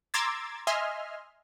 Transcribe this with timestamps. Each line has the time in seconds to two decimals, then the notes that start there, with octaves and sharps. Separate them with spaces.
0.14 A#5 C6 D6 E6 G#6 A6
0.67 D#5 E5 G#5 C6 F6